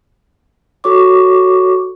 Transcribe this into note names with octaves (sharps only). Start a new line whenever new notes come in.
F#4 A4 C#5 C#6 D6